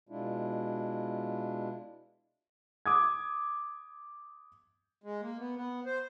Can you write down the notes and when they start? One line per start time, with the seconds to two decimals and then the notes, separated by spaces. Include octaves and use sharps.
0.09 B2 G#3 D4 E4 F4
2.86 D6 D#6 G#6
5.04 G#3
5.22 A#3
5.39 B3
5.56 B3
5.85 C5